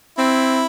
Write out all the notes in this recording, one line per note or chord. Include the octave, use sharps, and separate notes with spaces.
C4 E4